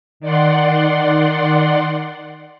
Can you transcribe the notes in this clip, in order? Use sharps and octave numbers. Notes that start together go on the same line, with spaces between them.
D#3 D5 F#5 C6